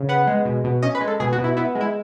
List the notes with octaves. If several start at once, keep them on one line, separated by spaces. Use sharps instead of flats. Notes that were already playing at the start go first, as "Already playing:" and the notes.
Already playing: C#3
B3 F#5
G#3
B2
B2
C#4 D#5
B4
G#3
A4
B2 G#4
F#4
B2
E4
B3 E4
G#3
E4